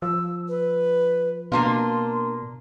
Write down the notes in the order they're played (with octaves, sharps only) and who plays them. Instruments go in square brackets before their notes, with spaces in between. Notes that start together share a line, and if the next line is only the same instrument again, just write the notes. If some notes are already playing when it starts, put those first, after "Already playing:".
[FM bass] F3 [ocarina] E6
[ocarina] B4
[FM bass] B2 [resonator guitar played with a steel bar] A#3 D4 F4 [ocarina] C6